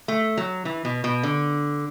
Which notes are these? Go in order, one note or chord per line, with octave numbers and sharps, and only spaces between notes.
A3
F#3
E3
B2
B2
D3